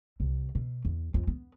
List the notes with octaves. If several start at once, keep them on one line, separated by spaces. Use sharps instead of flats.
C2
B2
E2
F2
B3